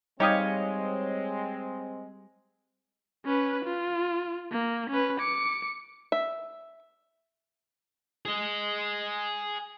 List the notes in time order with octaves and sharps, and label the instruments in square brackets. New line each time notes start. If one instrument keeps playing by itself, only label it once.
[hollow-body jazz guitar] G3 [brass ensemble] G#3 C4 [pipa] D#4 G4 F5 [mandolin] C#5 D#5
[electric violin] C#4 B4
F4
A#3
C#4 B4
D6 C#7
[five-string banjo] E5
[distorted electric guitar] G#4 D#5